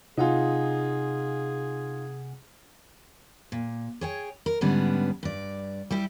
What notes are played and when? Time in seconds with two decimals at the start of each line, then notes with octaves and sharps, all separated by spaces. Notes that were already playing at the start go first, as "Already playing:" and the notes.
0.17 C3 D#4 F4 G#4 F#5 G#5
3.52 A#2
4.01 G#4 C#5 G5
4.46 A#4
4.61 G#2 D3 G3 B3 C#4 D4
5.23 G2 D5
5.91 G3 E4 G4